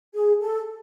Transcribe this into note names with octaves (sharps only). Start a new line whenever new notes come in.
G#4
A4